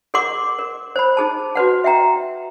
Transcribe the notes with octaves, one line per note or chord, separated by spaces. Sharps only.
G#4 A#4 F#5 C6 D6
A#4
C5 B5
D#4 G#4 A5
F#4 B4 F#5
E5 F#5 G5 A#5